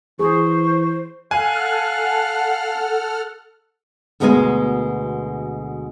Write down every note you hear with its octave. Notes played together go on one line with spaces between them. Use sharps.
E3 G#4 C5 C#6
A4 F5 F#5 G#5 F6 F#6
D2 B2 G#3 A#4 G5 G#5